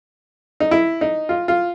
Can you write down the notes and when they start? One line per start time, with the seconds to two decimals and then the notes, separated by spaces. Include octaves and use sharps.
0.60 D#4
0.71 E4
1.01 D#4
1.29 F4
1.48 F4